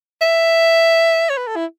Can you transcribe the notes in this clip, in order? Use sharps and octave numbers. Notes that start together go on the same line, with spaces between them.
E5
C#5
B4
A4
E4